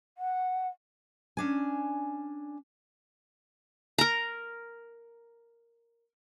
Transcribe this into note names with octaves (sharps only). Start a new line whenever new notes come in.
F#5
C#4 D4 G#5
A#4 A#5